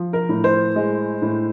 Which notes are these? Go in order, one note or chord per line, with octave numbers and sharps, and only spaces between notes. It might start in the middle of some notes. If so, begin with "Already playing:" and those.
Already playing: F3
A#4
A2
C5
G#3
A2